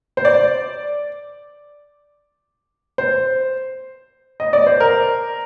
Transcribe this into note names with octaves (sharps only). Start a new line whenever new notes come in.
C5
D5
C5
D#5
D5
C5
A#4